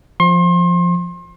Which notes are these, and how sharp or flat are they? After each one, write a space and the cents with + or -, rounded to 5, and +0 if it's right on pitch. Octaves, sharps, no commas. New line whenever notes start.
F3 +0 C6 +35